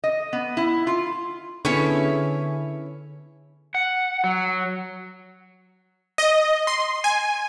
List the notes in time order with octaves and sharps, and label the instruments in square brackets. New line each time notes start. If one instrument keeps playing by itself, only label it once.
[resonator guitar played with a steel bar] D#5
B3
E4
F4
[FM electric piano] D3 [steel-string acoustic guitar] B3 G#4 A4 [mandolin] C#4 E4 C#5
[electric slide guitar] F#5
F#3
[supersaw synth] D#5
C6
G#5